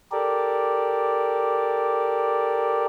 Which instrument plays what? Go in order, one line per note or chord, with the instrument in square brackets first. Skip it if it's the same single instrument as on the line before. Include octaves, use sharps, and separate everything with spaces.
[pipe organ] G4 A4 A#4 D5